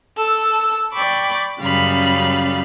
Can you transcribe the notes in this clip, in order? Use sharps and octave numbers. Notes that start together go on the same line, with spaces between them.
A4 E6
D5 G5 B5 C#6 D6
F#2 C#3 G3 F5 B5